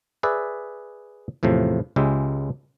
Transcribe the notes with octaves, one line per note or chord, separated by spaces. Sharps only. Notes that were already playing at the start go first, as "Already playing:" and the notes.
G#4 B4 D5 E5
E2 A2 C3 F3
C#2 C#3 G#3 G4 E5